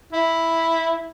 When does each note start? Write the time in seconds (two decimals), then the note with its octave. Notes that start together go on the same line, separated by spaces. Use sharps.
0.13 E4